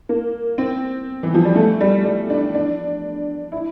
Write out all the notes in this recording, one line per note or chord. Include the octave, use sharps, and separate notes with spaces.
A#3
C4
E3
F3
G3
A3
G3
G3
D4
D4
E4